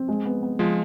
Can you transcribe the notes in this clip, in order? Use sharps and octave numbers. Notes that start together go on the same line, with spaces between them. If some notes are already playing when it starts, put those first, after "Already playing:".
Already playing: C4
G#3
B3
B3
F3 G#3 F4